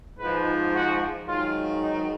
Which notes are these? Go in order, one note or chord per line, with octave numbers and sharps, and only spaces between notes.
G#2 F3 B4
F#4
G#2 D#3 F#3 F4
D#4